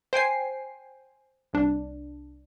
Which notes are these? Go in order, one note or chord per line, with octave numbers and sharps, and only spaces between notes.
C5 G5 G#5 C7
C2 D4